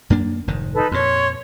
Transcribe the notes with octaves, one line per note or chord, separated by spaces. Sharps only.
F#2 A#3 D4
F1 G#2 D#3
D#4 A4 B4
F2 A#2 C#5 C6